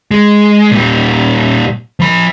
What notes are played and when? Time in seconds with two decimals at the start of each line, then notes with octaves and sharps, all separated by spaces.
0.11 G#3
0.71 A#2 G3
2.00 F3 B5